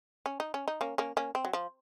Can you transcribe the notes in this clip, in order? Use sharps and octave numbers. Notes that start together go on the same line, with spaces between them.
C#4
D#4
C#4
D#4
A#3 C#4
A#3 C#4
A#3 C#4
C4
F#3
F3